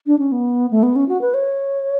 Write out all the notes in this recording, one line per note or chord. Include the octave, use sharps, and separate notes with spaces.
D4
C#4
B3
A3
B3
C#4
F#4
B4
C#5